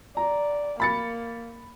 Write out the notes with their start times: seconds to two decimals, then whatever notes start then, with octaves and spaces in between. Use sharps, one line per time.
0.17 D5 A#5
0.80 A#3 B5 A6 C#7